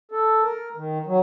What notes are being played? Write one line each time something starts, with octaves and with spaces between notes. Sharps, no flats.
A4
A#4
D#3
F#3